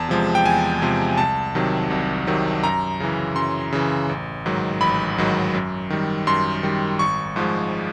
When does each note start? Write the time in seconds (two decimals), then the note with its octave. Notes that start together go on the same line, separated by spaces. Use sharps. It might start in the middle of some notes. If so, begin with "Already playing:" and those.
Already playing: E2 A5
0.09 C3 F3 G#3
0.35 G5
0.45 E2 G#5
0.82 C3 F3 G#3
1.18 C2 A5
1.55 C3 D#3 F#3
1.90 C2
2.27 C3 D#3 F#3
2.63 F#2 A#5
3.00 C#3 E3
3.36 F#2 C6
3.72 C#3 E3
4.09 A1
4.46 G#2 D#3 F#3
4.81 A1 B5
5.18 G#2 D#3 F#3
5.54 F#2
5.90 D#3 G3
6.27 F#2 C6
6.63 D#3 G3
6.99 G#1 C#6
7.36 G#2 F3 G#3